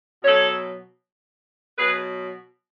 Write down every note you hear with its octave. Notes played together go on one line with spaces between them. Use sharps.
B2 F#3 A4 C#5
B2 F#3 G#4 B4